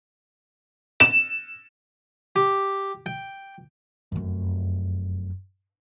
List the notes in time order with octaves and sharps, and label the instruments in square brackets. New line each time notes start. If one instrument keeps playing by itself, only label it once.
[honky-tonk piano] E7
[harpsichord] G4
G5
[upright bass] F1 F#2